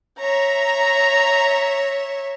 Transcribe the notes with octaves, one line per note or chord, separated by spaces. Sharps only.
C#5 E5 A#5